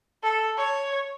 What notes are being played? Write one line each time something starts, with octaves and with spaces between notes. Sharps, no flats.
A4
C#5